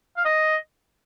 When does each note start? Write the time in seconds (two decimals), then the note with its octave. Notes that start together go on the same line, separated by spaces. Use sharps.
0.17 F5
0.25 D#5